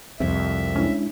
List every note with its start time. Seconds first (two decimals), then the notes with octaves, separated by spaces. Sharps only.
0.20 C2 F2 C3 E5
0.76 G#3 C#4 D4 E4